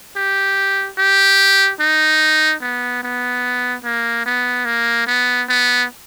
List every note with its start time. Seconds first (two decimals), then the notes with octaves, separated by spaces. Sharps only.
0.16 G4
0.98 G4
1.80 D#4
2.61 B3
3.03 B3
3.84 A#3
4.26 B3
4.65 A#3
5.07 B3
5.48 B3